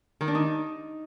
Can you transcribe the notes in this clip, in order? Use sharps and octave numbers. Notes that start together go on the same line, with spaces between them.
D#3
D4
D#4